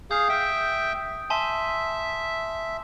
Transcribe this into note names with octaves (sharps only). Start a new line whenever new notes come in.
G#4 F5 D#6 G6
E5 G5
E5 G#5 A5 C6